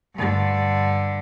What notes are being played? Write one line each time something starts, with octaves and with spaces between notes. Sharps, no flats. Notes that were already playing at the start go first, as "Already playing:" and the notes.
G2 D3